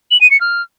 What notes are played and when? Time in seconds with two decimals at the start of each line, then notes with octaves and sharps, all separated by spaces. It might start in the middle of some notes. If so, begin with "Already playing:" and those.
0.11 F#7
0.21 D#7
0.31 C#7
0.41 F6